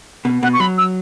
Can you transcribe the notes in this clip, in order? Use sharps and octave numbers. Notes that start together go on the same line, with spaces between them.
B2
B2 F#5
C#6
F#3 B5
E6